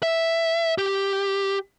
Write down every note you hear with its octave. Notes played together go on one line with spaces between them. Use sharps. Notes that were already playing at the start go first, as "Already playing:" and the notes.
E5
G4